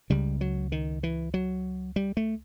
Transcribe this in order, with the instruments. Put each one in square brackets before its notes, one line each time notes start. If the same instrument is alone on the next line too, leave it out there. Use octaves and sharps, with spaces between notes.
[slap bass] C#2 C#3 G3
F#3
D#3
E3
F#3
G3
A3